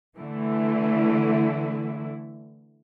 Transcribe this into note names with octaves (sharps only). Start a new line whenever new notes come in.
D3 E3 A3 E4